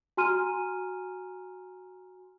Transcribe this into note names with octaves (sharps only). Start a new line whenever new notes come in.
F#4 G#5 A#5 C6 F6 D#7